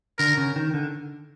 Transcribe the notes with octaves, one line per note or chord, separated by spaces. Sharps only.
D3 A#4
C#3
D#3
D3